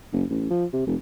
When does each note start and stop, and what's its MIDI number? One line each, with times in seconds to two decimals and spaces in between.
0.12 0.24 30
0.30 0.49 33
0.50 0.65 53
0.73 0.85 48
0.86 0.95 29